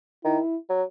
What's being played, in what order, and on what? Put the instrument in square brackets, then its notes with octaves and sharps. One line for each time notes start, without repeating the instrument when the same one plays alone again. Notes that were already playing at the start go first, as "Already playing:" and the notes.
[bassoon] D#3 [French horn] E4
[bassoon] F#3